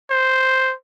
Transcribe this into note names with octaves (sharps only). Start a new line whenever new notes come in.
C5